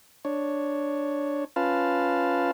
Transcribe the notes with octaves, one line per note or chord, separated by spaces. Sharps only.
D4 C#5
C#4 F4 B4 F5 A5